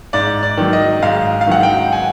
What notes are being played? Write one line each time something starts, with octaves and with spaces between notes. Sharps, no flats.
G#2 D5
D5
D#3 F#3
D#5
G#2 F5
F5
D#3 F#3 F#5
G5
G#5